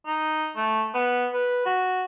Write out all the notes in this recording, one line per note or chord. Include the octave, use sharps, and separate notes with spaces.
D#4
A3
B3
B4
F#4